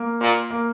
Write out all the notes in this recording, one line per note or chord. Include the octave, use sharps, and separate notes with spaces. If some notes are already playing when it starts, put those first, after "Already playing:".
Already playing: A#3
A#2
A#3